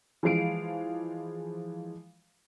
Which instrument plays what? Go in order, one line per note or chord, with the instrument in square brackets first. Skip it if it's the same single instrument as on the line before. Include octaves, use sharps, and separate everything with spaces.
[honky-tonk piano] E3 F3 G#3 F5 C7 D7